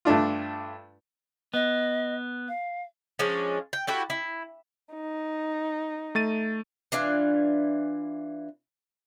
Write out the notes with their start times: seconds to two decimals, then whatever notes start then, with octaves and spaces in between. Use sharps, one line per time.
0.05 G2 A3 D4 F4
1.54 B3 D#5
2.48 F5
3.19 F3 G#3 C#4 D4
3.73 G5
3.87 E4 F#4 G4 A4
4.10 E4
4.96 D#4
6.15 A3 A6 D#7
6.92 E3 D4 F4 G#5